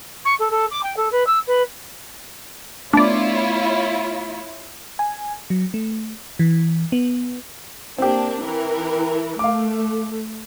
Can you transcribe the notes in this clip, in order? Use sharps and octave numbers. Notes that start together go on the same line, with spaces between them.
C#6
A4
A4
D6
G5
A4
B4
E6
B4
A3 B3 D4 E4 F4 C#5 D5
G#5
F#3
A3
E3
B3
A#3 C4 D4 G4
E3 A#4
A3 F5 D6